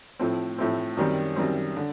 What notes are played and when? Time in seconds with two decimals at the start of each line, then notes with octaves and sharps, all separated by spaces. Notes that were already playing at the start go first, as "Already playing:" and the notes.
0.19 A2 F3 A3 C4
0.58 A2 F3 A3 C4
0.97 F#2 D#3 G3 C4
1.36 F#2 D#3 G3 C4
1.77 D3